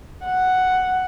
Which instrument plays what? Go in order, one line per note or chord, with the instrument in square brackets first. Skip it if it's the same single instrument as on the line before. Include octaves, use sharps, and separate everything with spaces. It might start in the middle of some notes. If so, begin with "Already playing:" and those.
[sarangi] F#5